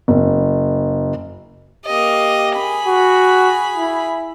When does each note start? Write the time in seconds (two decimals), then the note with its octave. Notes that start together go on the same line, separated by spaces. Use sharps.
0.08 F#1
1.86 A#3 G4 D#5
2.56 G#4 B5
2.86 F#4
3.77 E4